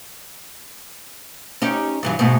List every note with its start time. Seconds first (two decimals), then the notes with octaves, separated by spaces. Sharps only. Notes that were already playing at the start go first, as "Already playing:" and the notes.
1.62 C#4 D#4 G4
2.03 G2 E3 F#3
2.19 G#2 B2 A3